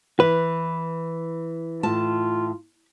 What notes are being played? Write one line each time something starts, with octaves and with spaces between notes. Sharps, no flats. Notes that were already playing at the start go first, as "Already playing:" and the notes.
E3 B4
A2 F4 A5